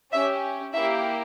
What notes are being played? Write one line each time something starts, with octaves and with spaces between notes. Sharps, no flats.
C#4 G4 E5
A#3 E4 G4 E5